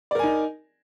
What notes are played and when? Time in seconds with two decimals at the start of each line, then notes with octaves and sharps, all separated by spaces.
0.11 D5
0.15 A#4
0.19 G#5
0.23 D#4